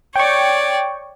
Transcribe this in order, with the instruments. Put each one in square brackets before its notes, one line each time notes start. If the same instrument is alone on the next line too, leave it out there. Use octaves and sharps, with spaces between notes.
[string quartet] C#5 D5 [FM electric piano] G5 C#6